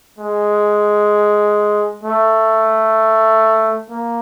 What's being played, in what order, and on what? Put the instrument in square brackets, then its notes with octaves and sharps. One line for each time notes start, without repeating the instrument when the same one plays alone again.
[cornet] G#3
A3
A#3